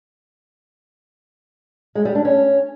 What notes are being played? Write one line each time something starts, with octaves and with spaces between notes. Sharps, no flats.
G#3
G3
D4
C#4